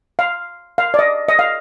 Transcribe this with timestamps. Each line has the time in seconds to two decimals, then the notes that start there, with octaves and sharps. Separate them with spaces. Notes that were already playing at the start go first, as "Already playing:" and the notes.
0.19 F5
0.78 F5
0.94 D5
0.99 D#5
1.29 D#5
1.39 F5